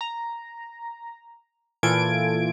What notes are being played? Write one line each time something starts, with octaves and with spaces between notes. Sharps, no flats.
A#5
A#2 E3 F4 A4 G#6 D7